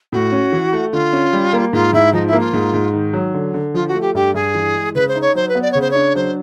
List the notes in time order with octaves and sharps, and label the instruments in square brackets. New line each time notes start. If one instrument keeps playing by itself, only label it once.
[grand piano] A2 [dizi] F#4
[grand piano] C#4
E3
A3
[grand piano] D3 [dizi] F4
[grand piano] C#4
G3
A#3
[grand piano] G#2 [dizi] F4
[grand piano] G#2 [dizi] E4
[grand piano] F3 [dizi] D#4
[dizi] E4
[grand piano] A#3
[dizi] F4
[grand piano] G#2
G#2
D#3
F#3
D3
D3
[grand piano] F3 [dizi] F4
[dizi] F#4
[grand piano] A3
[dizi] G4
[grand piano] G2 [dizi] G4
[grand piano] G2 [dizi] G#4
[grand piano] E3
G#3
[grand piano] C#3 [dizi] B4
[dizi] C5
[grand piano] D#4
[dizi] C#5
[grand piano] F#3 [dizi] C5
[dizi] B4
[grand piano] B3
[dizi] D5
[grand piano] C#3 [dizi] C#5
[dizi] C5
[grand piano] D4 [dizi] C#5
[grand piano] F#3 [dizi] C5